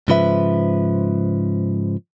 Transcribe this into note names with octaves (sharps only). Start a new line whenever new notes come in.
G#2 C#3 F3 B4 E5